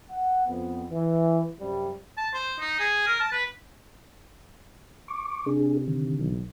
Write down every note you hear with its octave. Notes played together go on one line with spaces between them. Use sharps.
F#5
F2 B3
E3
F#2 C3 G3
A5
C5
D#4
G#4
A#4
A5
B4
C#6 D6
C3 D4 G#4
D3 D#3
B1